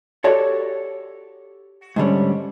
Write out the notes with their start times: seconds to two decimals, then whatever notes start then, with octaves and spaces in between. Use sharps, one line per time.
0.24 F#4 G4 A4 C#5 D5
1.96 G#2 D3 G3 C#4